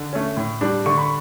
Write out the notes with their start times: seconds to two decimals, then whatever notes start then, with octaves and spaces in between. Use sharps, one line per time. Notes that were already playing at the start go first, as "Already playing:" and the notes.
Already playing: D3
0.13 A3 C#4
0.37 A2
0.61 G3 D4
0.86 D3 C#6
0.98 B5